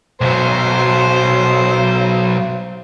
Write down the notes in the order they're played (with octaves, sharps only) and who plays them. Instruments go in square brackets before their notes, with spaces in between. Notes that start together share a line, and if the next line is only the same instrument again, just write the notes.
[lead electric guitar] B1 F#3 [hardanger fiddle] C5